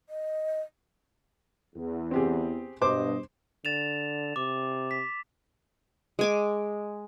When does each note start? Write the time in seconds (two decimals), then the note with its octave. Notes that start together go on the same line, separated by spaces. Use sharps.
0.09 D#5
1.75 E2
2.11 C4 G4 G#4
2.82 G2 B2 C5 D#5 D6
3.65 D3 A6 E7 F7
4.36 C3 D6
4.91 B6
6.19 G#3 G#5 D6